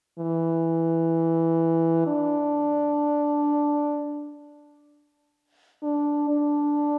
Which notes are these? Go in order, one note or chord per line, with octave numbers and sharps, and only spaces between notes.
E3
D4
D4
D4